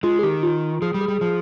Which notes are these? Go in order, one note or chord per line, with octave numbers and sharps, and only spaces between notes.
G#3 F4
G#4
D#3 G4
F4
F3 G#4
G3
G#4
G3
F3